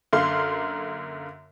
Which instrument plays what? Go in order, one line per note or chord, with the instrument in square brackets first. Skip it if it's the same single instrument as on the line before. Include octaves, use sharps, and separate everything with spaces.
[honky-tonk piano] F#2 D3 A#3 F5 C6